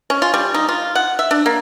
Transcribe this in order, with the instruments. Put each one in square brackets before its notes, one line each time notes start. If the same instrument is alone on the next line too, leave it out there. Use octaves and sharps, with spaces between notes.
[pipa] C#4
F4
G3
D#4
F4
F#5
E5
D4
A#3